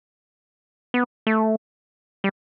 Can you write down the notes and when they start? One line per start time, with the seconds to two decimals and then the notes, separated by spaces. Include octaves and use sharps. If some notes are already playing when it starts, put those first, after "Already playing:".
0.94 B3
1.27 A3
2.24 G3